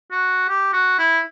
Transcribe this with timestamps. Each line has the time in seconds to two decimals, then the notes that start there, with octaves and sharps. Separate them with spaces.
0.11 F#4
0.49 G4
0.73 F#4
0.99 E4